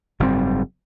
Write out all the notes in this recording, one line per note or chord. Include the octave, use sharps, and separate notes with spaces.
F#1 G#2 G3 C4